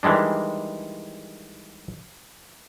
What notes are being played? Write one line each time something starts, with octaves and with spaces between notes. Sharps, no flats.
D#3 E3 G3 G#3 D4